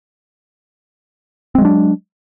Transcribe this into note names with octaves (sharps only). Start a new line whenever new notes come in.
F#3 G#3 C4 D4